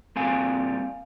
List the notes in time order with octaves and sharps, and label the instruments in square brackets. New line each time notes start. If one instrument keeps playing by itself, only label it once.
[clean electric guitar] A#2 G3 C4 F5 G#5